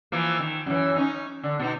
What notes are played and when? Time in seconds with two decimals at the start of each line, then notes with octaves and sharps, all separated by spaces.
0.12 E3 F3 A#3
0.39 D#3
0.66 F#2 E3
0.97 C#4 D#4
1.43 D3
1.59 B2 D#4